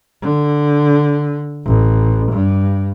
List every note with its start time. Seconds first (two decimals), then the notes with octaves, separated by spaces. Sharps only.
0.22 D3
1.65 A1
2.32 G2